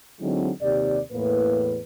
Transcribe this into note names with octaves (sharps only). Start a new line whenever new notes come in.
D3 F#3 G#3 C4 D#4 E4
D#2 C3 G4 D5
E2 A2 A#3 B4